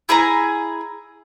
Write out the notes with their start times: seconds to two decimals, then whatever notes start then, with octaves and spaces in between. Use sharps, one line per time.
0.09 E4 G#4 G#5 A#5